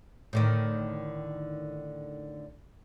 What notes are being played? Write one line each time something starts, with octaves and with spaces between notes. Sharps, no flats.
A2 D3 D#3